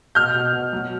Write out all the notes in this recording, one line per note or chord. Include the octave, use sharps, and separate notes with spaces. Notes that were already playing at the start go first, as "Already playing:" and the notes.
B2 F6 G6
B2
B2
F#3